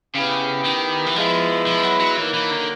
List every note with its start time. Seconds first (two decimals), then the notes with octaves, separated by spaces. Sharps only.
0.15 C#3 B3 E4 G4
0.65 D#3
1.06 E3
1.16 F3 G#3 B3 E4
1.67 F3
1.83 F#3
2.00 F#3
2.17 D#3 E3 F#3 A#3 D#4
2.34 E3
2.51 D3